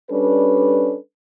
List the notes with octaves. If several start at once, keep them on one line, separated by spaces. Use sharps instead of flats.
G3 C#4 D4 A4 B4